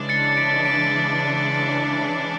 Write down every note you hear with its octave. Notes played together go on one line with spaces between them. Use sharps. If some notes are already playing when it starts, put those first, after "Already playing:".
Already playing: C#3 E3 G#3 D4
A6 C#7
B6 D7
B6 D7